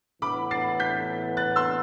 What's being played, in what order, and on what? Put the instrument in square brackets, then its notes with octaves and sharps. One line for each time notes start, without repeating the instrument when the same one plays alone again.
[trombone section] A2 E3 B3 [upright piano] B5 D6
[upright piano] A6 C7
G6 B6
F#6 A6
C6 E6